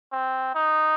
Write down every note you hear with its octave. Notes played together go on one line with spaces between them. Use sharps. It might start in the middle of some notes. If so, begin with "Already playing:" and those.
C4
D#4